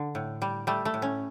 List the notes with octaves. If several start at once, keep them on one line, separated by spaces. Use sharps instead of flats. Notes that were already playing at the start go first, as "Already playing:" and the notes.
Already playing: D3
A2
G3
G3 A3
A3
A2
C#4